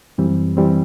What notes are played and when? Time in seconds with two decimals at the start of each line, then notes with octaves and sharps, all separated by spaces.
0.18 F#2 E3 G3 C4
0.57 E3 G3 C4